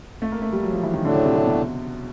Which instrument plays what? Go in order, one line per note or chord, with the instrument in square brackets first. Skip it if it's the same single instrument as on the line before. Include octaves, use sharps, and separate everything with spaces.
[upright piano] A3
A#3
A3
G3
F#3
F3
E3
D#3
[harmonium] A2 F#3 A3 D4 [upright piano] D3
[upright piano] C#3
C3
C3
B2